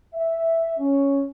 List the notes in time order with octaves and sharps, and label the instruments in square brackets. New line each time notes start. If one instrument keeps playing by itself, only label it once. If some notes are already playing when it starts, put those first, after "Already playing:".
[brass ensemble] E5
C#4